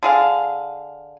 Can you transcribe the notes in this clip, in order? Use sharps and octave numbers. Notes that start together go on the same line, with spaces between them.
D3 G#4 F5